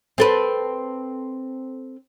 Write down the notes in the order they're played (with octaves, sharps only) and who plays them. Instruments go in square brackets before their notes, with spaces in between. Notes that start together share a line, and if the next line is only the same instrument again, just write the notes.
[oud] C4 A4 B4